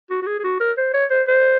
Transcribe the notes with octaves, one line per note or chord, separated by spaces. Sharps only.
F#4
F#4
G#4
G#4
F#4
A#4
C5
C#5
C5
C5